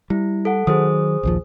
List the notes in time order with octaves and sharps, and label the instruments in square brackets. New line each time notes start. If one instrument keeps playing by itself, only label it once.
[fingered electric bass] G3 [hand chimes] E4
[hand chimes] A4 F#5
[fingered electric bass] D#3 F#3 [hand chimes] G#4 C5 D#6
[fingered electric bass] A#1 D#2 F3